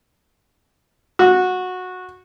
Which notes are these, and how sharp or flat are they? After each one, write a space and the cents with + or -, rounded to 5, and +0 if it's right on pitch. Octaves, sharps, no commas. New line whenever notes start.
F#4 -15